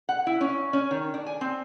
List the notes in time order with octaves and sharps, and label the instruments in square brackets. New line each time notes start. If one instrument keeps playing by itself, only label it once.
[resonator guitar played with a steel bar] F#5
E4
C#4
C#4
D#3
D4
G#5
C4